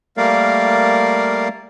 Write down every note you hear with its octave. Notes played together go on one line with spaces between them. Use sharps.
G3 A3 A#3 A#4 D5 F5